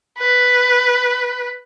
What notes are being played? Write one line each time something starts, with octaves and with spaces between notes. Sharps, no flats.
B4